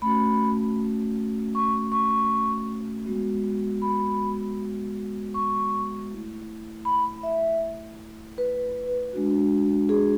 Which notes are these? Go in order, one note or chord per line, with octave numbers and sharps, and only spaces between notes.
A3 C#4 F#4 B5
C#6
C#6
G#3 B3 F#4
B5
C#6
A3 E4
B5
E5
B4
G#3 D4 F#4
G#4